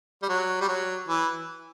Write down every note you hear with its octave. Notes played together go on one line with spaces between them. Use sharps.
G3
F#3
G3
F#3
E3